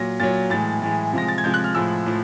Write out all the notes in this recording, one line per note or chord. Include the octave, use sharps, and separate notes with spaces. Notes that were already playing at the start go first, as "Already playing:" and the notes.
Already playing: A#2 F#3 A#6
A#2 F#3 A6
A2 E3 G#3 A6
A2 E3 G#3
C3 F3 G#3 A#6
A6
G#6
C3 F3 G#3 G6
F#6
F6
A2 F3 G#3 E6
A2 F3